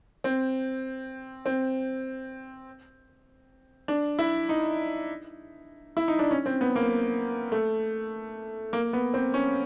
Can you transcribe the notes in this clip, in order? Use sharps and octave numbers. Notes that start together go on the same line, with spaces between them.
C4
C4
D4
E4
D#4
E4
D#4
D4
C#4
C4
B3
A#3
A3
A#3
B3
C4
C#4